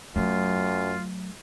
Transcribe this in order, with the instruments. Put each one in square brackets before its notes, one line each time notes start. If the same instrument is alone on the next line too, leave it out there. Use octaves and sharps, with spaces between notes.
[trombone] F#2 [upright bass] F#3 A3 [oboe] F4